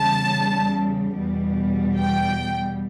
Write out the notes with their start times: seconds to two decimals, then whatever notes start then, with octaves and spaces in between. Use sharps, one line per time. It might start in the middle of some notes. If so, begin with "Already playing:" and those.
Already playing: E2 C#3 G3 A5
1.15 E2 B2 G3
1.97 G5